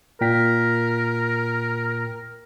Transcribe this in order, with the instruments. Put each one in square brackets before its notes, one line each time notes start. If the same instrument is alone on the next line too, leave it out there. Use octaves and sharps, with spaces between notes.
[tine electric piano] A#2 G5 B6 [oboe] A#4